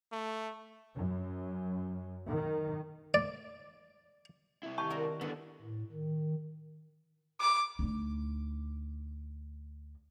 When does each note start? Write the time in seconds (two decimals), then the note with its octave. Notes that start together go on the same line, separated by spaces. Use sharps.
0.12 A3
0.95 F#2
2.30 D#3
3.14 D5
4.63 C3 E4
4.78 D#3 G4 A5 C#6
4.90 C4 F#4 A#4 D5
5.21 D3 B3 D4 E4
5.62 A2
5.92 D#3
7.41 D6
7.79 D2 D#4